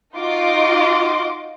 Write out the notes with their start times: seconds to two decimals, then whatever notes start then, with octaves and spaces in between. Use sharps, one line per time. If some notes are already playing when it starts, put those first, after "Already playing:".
0.15 D#4 F4 F#4 D#5 C6 D6